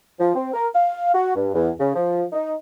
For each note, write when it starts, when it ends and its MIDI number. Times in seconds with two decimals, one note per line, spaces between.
0.20 0.32 53
0.36 0.51 60
0.54 0.67 70
0.75 1.11 77
1.14 1.36 66
1.36 1.49 43
1.54 1.70 40
1.80 1.95 49
1.96 2.23 53
2.33 2.54 63